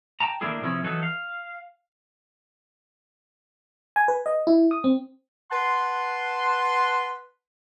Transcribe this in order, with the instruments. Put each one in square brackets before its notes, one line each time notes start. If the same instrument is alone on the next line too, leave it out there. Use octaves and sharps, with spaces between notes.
[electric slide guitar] G5 A5 A#5
D#3 A3 A#3 D4 E4 G#4
C3 F3 B3 C#4 E4 G#4
E3 F#3 D#4 A4 B4
F5
[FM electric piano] G#5
B4
D#5
E4
D#6
C4
[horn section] B4 F#5 A5 C6